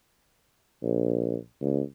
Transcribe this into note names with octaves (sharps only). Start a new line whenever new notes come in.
A#1
C#2